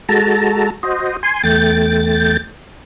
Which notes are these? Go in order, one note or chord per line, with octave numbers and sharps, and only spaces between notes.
G#3 F#4 A4 A5 A#5
F#4 C5 D#5
G#5 C6
E2 A3 G5 A6